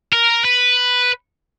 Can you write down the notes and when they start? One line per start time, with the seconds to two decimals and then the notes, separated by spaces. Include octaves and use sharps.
0.13 A#4
0.45 B4